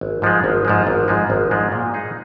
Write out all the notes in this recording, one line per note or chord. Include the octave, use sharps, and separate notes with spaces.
G#1
G#2 F3 G#3
G#1
G#2 F3 G#3
G#1
G#2 F3 G#3
G#1
G#2 F3 G#3
A#2
G#3 D#4 G#4